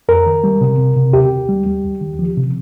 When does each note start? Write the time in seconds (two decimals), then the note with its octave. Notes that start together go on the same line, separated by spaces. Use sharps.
0.08 F2 A#4
0.26 D#3
0.44 G3
0.61 C3
0.78 C3
0.96 C3
1.13 D#2 G4
1.31 D#2
1.49 G3
1.66 G3
1.84 D#2
2.01 D#3
2.19 F3
2.37 C3